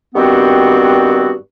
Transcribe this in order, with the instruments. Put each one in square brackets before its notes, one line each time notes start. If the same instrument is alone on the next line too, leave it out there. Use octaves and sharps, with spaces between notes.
[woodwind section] G2 D#3 B3 C4 F#4